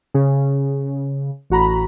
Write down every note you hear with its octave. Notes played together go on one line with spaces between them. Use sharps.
C#3
A1 F#4 A#5 B5